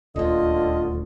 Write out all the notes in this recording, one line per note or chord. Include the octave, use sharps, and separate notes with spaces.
D#1 D2 D3 F4 D#5